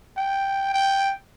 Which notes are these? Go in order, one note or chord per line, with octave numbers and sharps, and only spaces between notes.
G5
G5